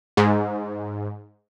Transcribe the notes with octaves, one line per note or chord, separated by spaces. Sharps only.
G#2